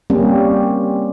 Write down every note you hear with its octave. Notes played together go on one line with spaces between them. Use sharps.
G3 A#3 C4 C#4